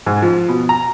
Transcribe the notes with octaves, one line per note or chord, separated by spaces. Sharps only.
G#2
F3
B2
A#5